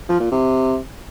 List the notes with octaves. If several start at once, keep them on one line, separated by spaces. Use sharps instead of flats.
F3
A#2
C3